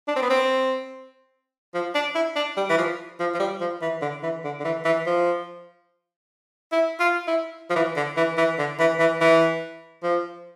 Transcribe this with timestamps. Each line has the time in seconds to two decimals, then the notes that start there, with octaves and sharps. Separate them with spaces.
0.08 D4
0.16 C4
0.22 B3
0.30 C4
1.74 F3
1.95 D4
2.15 E4
2.36 D4
2.57 G3
2.69 E3
2.78 F3
3.20 F3
3.34 F3
3.39 G3
3.60 F3
3.82 E3
4.02 D3
4.23 E3
4.44 D3
4.60 D3
4.64 E3
4.85 E3
5.06 F3
6.72 E4
7.00 F4
7.27 E4
7.70 F3
7.76 E3
7.96 D3
8.17 E3
8.38 E3
8.59 D3
8.79 E3
8.99 E3
9.21 E3
10.03 F3